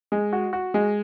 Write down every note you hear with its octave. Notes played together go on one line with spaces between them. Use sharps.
G#3
F#4
F#4
G#3